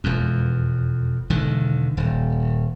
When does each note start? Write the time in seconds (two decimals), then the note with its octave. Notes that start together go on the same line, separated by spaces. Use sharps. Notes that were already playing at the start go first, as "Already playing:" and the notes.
0.04 E1 F2
1.30 E1 D3 D#3
1.97 D#1